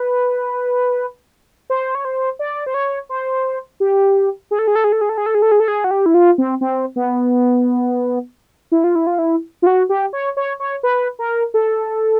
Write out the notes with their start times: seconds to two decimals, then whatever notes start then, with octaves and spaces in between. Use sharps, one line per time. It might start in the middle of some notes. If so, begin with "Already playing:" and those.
Already playing: B4
1.70 C5
1.95 C#5
2.05 C5
2.39 D5
2.66 C5
2.74 C#5
3.09 C5
3.80 G4
4.51 G#4
4.59 A4
4.68 G#4
4.75 A4
4.84 G#4
4.92 A4
5.01 G#4
5.09 A4
5.18 G#4
5.26 A4
5.35 G#4
5.42 A4
5.52 G#4
5.60 A4
5.68 G#4
5.84 F#4
5.91 G4
6.06 E4
6.14 F4
6.38 C4
6.61 C4
6.96 B3
8.72 E4
8.84 F4
8.95 E4
9.07 F4
9.19 E4
9.62 F4
9.67 F#4
9.89 G4
10.13 C#5
10.37 C#5
10.60 C#5
10.83 B4
11.19 A#4
11.54 A4